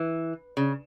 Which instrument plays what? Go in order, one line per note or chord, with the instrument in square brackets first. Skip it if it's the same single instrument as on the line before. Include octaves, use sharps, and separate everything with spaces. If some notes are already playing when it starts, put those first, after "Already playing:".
Already playing: [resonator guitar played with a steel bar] E3
C#3